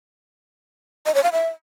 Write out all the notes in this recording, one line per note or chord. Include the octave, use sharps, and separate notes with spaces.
D#5
C#5
F5
E5